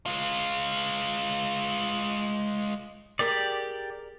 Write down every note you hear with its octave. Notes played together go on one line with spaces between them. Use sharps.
G#3 F4
G4 G#4 A#4 D5 A#5